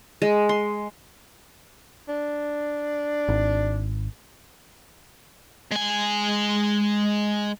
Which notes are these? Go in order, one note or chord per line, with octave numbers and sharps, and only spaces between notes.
G#3
C6
D4
G#1
G#3 G#5